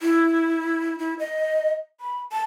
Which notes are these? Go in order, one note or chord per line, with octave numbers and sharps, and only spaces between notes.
E4
E4
D#5
B5
A5